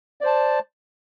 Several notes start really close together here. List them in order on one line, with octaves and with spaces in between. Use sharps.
D5 C5 A5